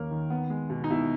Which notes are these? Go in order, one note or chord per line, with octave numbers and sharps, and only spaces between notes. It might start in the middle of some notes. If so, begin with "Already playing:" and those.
Already playing: D#2 D#3 A#3 C#4 A#4
D#3
B3
G#3
B2
D#4
B2 E4